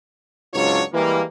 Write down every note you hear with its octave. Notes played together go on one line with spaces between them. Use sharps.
C#2 G#2 F#3 D4 F4 C#5
E3 G3 G#3 A#3